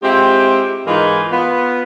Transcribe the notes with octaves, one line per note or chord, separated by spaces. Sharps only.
G#3 C4 E4 F4 G4
G#2 E3 D#4 F4 G#4 A#4
B3 F4